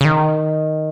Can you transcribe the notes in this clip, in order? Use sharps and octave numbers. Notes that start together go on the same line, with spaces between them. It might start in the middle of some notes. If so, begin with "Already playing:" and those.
C#3
D#3